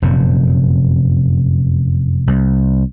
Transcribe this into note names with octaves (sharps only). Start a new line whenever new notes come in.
F1 F#2 A#2
C2